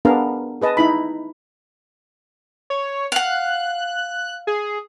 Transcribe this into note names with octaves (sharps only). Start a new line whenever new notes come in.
B3 D4 G#4 A#4 F5
G#4 B4 D#5 A5
D#4 E4 B5
C#5
F5 F#5 F#6
G#4